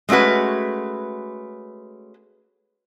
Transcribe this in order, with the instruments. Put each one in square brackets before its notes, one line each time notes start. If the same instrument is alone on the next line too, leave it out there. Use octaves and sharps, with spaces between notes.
[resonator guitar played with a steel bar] G#3 A3 C#4 F#4 B4